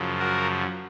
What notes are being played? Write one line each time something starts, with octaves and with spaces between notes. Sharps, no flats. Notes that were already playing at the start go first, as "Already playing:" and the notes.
Already playing: F#2 C#3 F3
F#4 A#4